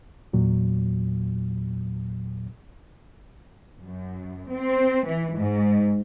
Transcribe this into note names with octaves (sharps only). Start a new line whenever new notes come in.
E2 A#2 F#3
F#2
C4
E3
G#2